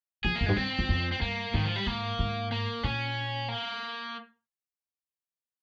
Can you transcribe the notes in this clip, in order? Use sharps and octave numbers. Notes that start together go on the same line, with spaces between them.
F3 G#4
A#3
F2
G2 G#3
G2 C4
F2
F2
C4
G2 A#3
G#2 D#3
F3
G3
G#2 A#3
G#2
A#3
A#2 C#4
A#3